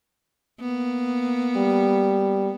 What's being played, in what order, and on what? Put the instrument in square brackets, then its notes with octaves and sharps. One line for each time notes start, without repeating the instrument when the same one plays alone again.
[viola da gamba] A#3 B3
[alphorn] G3